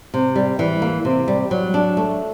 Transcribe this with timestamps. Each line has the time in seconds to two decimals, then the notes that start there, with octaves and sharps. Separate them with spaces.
0.14 C3
0.36 G3
0.59 E3
0.82 A#3
1.05 C3
1.28 G3
1.51 F#3
1.74 D4
1.97 A3